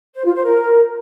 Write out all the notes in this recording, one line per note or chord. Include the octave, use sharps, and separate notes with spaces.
C5
F4
C5
A#4